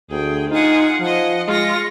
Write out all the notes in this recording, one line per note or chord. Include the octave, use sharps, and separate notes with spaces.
D2 G#4 G5
D#4 F4 G#4 F#5
F3 D#5 F#5
G#3 F4 C#6 A#6